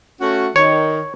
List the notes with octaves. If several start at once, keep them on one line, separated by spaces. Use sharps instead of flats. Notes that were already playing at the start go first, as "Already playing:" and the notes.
A3 C#4 F#4
D#3 C#5